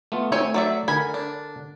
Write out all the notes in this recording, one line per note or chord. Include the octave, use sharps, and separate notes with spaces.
A3 B3 F4
A3 C4 C#5 G#5
F#3 D5 E5
D3 A#4 G#5 B5
D4